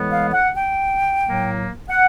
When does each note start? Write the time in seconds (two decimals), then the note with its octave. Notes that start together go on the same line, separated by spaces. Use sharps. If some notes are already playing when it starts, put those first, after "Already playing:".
Already playing: A2 E3 G#3 B3
0.11 F5
0.33 F#5
0.56 G5
1.23 A2 F#3 A#3
1.90 F#5